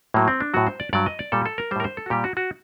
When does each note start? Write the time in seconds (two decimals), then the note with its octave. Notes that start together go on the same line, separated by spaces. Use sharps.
0.14 A2 F#3 A#3
0.28 C4
0.40 D4
0.54 A2 F#3 F#4
0.67 C5
0.80 D5
0.93 G2 F#3 D5
1.06 D#5
1.19 D5
1.32 A#2 G3 A4
1.46 A4
1.58 A#4
1.71 G3 C5
1.76 A2 A#4
1.84 C5
1.97 A4
2.06 F#4
2.10 A#2 G3 G4
2.24 F#4
2.37 F#4